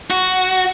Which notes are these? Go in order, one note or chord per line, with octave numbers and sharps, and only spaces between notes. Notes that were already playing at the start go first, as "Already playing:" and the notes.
F#4